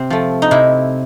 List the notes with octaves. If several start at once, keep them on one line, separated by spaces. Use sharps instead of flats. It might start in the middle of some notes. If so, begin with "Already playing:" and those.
Already playing: C3 C4
F3 A3
D#4
C3 E4